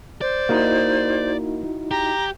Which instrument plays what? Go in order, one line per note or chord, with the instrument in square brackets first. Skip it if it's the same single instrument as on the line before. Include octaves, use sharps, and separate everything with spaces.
[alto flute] C5 [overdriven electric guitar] D5
[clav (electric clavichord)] A#3 D#5 [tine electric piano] D#4 E4 F#4
[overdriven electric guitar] G4 [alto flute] A#5